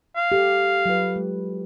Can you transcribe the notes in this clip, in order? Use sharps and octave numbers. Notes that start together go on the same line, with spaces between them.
F5
G4 A4
F#3 F4 B4
G#3